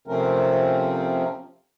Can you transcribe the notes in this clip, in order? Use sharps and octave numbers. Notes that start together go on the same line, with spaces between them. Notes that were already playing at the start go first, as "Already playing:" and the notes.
C3 F3 A3 C4 C#4 A#4